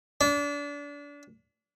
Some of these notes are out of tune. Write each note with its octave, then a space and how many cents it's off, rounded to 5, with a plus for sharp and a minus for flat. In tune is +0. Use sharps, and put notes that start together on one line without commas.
D4 -30